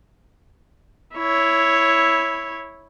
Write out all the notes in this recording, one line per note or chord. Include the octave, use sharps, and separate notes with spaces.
E4 C#5